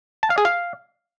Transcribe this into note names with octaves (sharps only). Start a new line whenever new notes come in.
A5
F5
G#4
F5